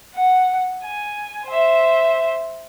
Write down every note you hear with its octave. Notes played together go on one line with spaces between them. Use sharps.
F#5
G#5
C5 E5